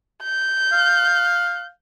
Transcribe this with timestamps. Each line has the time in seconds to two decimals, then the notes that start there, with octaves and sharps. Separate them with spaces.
0.23 G6
0.72 F5